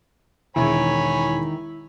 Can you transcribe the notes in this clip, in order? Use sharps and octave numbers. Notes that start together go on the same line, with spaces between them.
E1 D#3 E4 G#4 C#5 G#5 B5 G#6